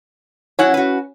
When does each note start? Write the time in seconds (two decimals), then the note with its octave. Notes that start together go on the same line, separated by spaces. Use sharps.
0.59 F#3 C#4 E4 F#5
0.74 F#4 B4